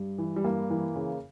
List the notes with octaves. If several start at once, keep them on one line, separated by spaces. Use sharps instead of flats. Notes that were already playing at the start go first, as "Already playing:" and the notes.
Already playing: G2
E3
G3
G2 A#3
E3
C#3